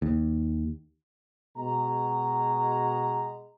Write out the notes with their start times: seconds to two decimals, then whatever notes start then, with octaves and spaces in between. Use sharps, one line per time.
0.02 D#2
1.57 B2 G#3 F#4 A#5